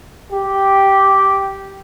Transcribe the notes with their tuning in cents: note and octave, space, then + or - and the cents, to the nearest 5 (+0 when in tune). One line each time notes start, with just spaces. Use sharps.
G4 -5